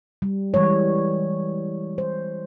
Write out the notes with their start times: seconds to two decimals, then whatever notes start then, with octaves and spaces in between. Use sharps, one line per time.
0.22 G3
0.54 E3 G3 G#3 C#5
1.98 C5